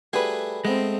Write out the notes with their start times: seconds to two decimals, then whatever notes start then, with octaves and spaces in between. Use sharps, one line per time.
0.13 G3 A3 F#4 G#4 B4
0.65 G#3 A3 B3 C4